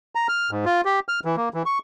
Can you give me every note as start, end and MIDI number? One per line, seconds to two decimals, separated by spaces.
0.15 0.27 82
0.28 0.51 89
0.51 0.65 44
0.65 0.81 65
0.85 1.00 67
1.09 1.20 89
1.25 1.36 52
1.37 1.49 58
1.54 1.63 52
1.66 1.79 85